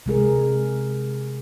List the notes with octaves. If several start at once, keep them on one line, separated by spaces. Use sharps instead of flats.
C3 G#3 G#4 A#4